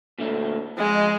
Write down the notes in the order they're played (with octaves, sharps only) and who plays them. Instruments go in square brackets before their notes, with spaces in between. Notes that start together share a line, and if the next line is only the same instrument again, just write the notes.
[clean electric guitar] A#2 D3 A3
[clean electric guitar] F2 D#5 [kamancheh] G#3